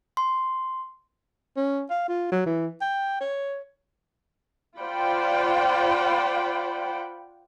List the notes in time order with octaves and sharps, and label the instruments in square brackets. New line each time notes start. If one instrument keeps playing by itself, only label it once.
[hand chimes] C6
[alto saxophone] C#4
F5
F4
F#3
E3
G5
C#5
[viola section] F4 C5 D5 F#5 G5 B5